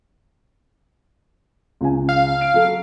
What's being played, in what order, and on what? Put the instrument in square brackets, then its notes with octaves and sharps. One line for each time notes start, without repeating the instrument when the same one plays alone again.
[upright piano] C#2 C#3 G#5
[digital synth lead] F5
[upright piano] F6 D7
F#3 A4